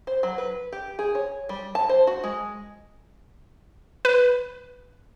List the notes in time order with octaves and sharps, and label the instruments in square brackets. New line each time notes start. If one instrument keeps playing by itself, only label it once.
[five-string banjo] C5
F#3
B4
G4
G#4
C#5
G3
A5
C5
F#4
G#3
[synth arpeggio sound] B4